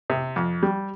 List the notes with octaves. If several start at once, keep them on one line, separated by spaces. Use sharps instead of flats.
C3
F2
G3